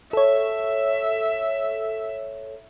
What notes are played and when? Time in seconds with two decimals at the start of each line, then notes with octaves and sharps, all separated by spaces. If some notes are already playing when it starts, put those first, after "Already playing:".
0.13 A4 C#5 E5